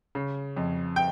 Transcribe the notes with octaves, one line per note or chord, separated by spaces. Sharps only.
C#3
F2
G5